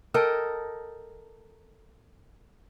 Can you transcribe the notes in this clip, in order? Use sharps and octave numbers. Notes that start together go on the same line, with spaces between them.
A4 A#4 D#5 G5